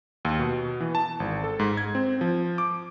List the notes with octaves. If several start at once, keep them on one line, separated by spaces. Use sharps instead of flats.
D#2
B2
E3
A5
G#1
A4
G#2
G#6
C4
F3
D6